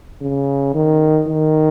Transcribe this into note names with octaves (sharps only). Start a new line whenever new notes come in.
C#3
D#3
D#3